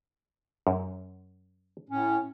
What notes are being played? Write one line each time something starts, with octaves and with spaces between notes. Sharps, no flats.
F#2
A2 C#4